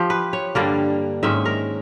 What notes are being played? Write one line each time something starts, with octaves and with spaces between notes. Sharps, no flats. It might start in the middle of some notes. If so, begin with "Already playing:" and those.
Already playing: F3 G4
B4
C#5
G2 D3 G3 A#3 D5
G#2 D#3 G#3 C#4 E5
A#4